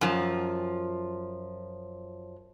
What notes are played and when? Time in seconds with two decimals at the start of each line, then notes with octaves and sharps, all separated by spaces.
0.01 F#2 F3